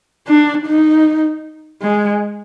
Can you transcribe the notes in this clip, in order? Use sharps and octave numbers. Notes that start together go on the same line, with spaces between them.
D4
D#4
G#3